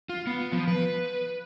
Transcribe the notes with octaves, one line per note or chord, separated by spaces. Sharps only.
F4
B3
F3
B4